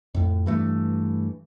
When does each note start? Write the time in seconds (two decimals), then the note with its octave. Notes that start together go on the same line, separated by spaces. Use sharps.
0.14 F2 A2
0.46 G2 E3 A3